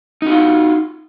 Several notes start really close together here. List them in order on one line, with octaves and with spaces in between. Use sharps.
D#4 F#4 F4